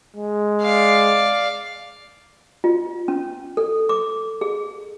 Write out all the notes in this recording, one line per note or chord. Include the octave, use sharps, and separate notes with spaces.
G#3
D5 F5
F4
C#4
A4
D6
G#4